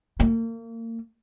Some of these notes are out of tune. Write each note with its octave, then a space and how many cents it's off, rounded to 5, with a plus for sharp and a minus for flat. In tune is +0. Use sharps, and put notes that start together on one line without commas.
A#3 -35